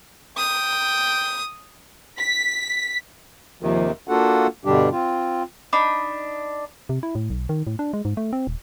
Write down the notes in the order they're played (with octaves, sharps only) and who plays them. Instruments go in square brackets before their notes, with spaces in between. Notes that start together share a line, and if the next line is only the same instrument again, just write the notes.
[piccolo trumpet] G5 [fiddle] D#6
[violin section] B6
[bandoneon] D#2 C3 D#3 [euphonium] F3
[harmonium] A#3 D4 F4 F#4 A4 F#5
G2 B2 D3 G3 D4 G4
C4 F4
[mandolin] D4 D#4 B5
[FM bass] C3
E4
A2
B1
D#3
A2
D4
G#3
G#2
A3
C4
D#1